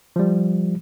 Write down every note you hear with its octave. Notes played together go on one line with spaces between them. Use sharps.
F3 G3